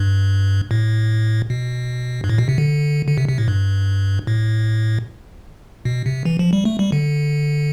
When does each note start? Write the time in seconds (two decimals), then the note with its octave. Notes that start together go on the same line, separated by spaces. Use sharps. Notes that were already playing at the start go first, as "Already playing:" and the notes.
Already playing: G2
0.71 A2
1.50 B2
2.24 G2
2.29 A2
2.38 B2
2.49 C3
2.58 D3
3.08 D3
3.18 C3
3.29 C3
3.38 A2
3.48 G2
4.27 A2
5.85 B2
6.06 C3
6.25 E3
6.39 F3
6.53 G3
6.65 A3
6.79 G3
6.92 D3